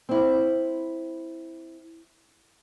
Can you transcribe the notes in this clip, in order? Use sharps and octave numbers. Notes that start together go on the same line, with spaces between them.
C4 E4